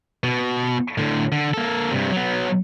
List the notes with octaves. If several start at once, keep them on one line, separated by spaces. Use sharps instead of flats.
B2
A2 D3
D3
A#3 A4
G2 C3
F#3 B3